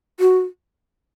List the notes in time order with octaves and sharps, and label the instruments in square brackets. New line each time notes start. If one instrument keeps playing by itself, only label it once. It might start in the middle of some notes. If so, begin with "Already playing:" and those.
[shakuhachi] F#4